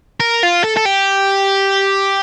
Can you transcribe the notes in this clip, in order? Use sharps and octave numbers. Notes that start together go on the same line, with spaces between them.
A#4
F4
A4
A4
G4